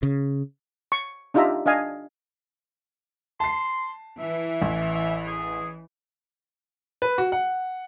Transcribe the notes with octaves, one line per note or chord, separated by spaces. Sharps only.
C#3
C#6
D4 D#4 F4 G4 E5 A#5
D4 D#5 F5 G#5
A5 C6 C7
E3 E5
A1
E5
G#4
B4
F#4
F#5